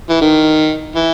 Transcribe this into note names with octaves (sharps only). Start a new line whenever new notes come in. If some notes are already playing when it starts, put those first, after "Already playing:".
E3
D#3
E3